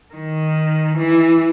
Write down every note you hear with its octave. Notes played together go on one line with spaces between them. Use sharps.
D#3
E3